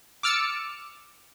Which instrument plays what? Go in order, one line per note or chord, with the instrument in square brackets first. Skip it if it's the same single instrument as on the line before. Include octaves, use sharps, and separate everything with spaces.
[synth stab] D6 E6 F6 A6 C#7